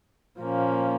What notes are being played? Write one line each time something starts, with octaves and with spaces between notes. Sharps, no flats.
A#2 F3 A#3 C#4